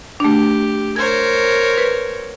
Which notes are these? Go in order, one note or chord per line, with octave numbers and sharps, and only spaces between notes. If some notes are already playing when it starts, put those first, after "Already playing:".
A3 D4 G4
A#4 C5 C#5 G#6
B4